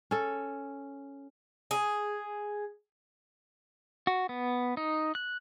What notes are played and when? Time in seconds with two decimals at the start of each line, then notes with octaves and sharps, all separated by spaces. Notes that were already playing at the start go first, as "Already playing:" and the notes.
0.11 C#4 A4
1.71 G#4
4.07 F#4
4.29 B3
4.77 D#4
5.15 F#6